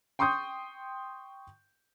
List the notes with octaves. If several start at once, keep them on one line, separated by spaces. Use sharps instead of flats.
G5 C6 C#6 D#6 G6